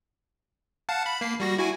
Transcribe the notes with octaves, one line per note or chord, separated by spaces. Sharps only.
F5 F#5 A5
B5
A#3 C7
G3 F#4 A#6
E4 F#4 G#5